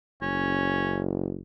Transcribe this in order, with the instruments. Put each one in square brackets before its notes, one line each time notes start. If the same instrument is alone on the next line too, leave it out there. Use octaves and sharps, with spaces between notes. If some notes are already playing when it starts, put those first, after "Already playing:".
[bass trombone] F#1 [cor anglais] C#4